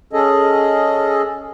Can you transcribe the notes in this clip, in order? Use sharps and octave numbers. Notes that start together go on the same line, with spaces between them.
C#4 G#4 A4 D#5